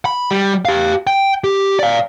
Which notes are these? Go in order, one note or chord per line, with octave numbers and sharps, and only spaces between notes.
B5
G3
G4 F5
G5
G4
D5 F5